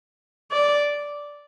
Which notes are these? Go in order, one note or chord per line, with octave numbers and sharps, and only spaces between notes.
D5